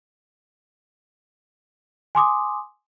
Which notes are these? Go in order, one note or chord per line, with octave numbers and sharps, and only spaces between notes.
G#5 C6 D6 D#6